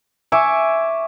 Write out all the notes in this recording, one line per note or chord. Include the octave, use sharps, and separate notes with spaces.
E5 G#5 C#6 D6